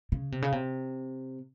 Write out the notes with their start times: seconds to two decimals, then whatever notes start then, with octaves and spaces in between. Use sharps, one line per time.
0.12 C#3
0.32 C3
0.42 C#3
0.52 C3